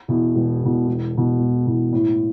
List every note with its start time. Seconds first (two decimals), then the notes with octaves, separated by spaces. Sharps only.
0.08 E2 B2
0.35 E1
0.61 E2 B2
0.87 E1
1.13 E2 B2
1.39 E1
1.66 E2 B2
1.92 A2